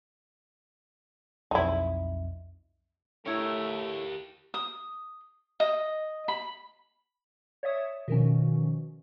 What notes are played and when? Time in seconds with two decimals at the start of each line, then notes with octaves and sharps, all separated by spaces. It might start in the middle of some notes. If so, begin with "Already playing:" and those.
1.51 B1 F2 D#4 E4
3.26 A2 A3 E4 G4 A#4 C#5
4.54 D#6
5.60 D#5
6.28 B5
7.63 C#5 D5 E5 D#6
8.08 B2 D#3 F3 C#4